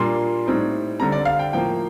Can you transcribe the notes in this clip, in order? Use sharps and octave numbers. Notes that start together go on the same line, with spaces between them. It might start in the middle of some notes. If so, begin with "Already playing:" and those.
Already playing: A#2 G3 A#3 D4 C6
A2 G3 C4 D#4
D3 G3 C4 A#5
D5
F5
G5
A2 F3 A#3 G5